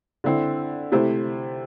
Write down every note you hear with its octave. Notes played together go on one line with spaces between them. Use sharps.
D3 C4 E4
C3 A3 E4 C5